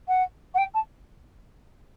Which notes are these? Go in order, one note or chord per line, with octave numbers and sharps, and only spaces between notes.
F#5
F#5
G5
A5